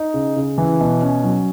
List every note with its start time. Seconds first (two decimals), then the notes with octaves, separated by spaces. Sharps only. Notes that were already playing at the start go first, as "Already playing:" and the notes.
Already playing: D#4
0.14 C#3
0.36 C#3
0.58 E3
0.81 B2
1.02 C#4
1.24 F#3